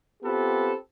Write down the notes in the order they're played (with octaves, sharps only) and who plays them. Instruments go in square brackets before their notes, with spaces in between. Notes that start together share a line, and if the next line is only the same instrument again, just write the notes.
[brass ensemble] B3 C4 F4 G4 A4 B4